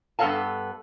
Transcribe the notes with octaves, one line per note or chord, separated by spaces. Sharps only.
G2 B3 A4 D5 F5 A5